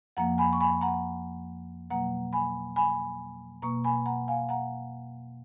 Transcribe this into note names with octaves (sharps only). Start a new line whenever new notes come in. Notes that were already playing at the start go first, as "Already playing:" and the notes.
F2 F3 A#3 F#5 A#5
G#5 B5
C#6
G#5 B5
F#5 A#5
B2 F#3 A#3 F#5 A#5
G#5 B5
G#5 B5
B2 A#3 A#5 C#6
G#5 B5
F#5 A#5
F5 G#5
F#5 A#5